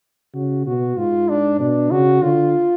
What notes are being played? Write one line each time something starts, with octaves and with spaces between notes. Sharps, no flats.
C#3 F#4
B2 F#4
G#2 F4
D4
B2 D4
C#3 F#4
D3 F4